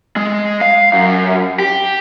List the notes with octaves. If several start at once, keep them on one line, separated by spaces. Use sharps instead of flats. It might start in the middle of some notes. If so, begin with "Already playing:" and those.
G#3
F5
F#2
G4